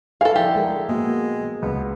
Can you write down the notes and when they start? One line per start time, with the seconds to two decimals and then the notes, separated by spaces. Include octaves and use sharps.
0.21 E3 G#4 A4 F5
0.36 D3 F3 E4 G4
0.56 G#3 G#4 A#4
0.89 G#3 A#3 B3 F#4
1.41 E3 F#3
1.62 C#2 B3